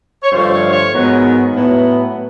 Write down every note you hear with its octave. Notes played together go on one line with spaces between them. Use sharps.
C#5
G2 D3 F3 A3 C5
C#5
C#5
G#2 D#3 F#3 B3
A2 F#3 B3